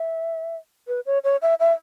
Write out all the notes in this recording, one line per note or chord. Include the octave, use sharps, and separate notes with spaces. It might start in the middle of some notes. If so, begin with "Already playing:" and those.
Already playing: E5
B4
C#5
C#5
E5
E5